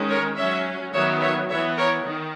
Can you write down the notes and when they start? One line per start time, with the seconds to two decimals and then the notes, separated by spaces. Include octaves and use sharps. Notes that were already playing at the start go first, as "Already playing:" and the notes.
Already playing: D#3 G#3 C#4
0.09 A#4 C#5
0.37 F#3 C#4 C#5 E5
0.93 D#3 F#3 B3 C#5 E5
1.21 C#5 E5
1.49 E3 B3 C#5 E5
1.77 A#4 C#5
2.05 D#3